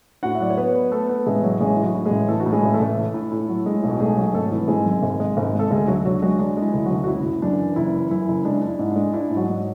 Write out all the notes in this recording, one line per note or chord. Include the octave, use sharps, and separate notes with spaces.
A2 F#4 F#5
E5
F#3 D5
C#5
B3 B4
B3
A3 B3 A4
B3
A1 G#3 G#4
F#3
A1 G#3 G#4
A2
F#3 F#4
A2
G#3 G#4
A1
E3 A3 A4
F#4
A2
G#3 G#4
A1
A3 A4
A1
A3
A2
A2
F#3
A2 G#3 G#4
B1
F#4
G#3 A3 G#4
F#3
G#1 A3 A4
E3
G#1 G#3 G#4
F#2
G#1
G#3
G#1
G#3 A4
D2 G#3 G#4
D2 F#3 F#4
D3 F#3 F#4
F#3 G#3 F#4
G#3 D4
G#3
E4
D2
F#3 F#4
D2
F#4
F#1 E4
F#1
F#2 D4
E3
F#1 E4
E3
F#2 E4
F#1
G#3 D4
D4
E4
G#2
D4
G#3
D4 E4
G#2
F#3 F#4
G#2